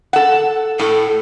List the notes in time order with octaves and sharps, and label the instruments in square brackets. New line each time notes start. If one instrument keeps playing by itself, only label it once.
[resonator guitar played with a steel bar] A4 F#5
[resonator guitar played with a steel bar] A2 [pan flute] A4